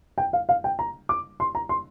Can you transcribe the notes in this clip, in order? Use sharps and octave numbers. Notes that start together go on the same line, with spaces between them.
G5
F5
F5
G5
A#5
D6
C6
A#5
C6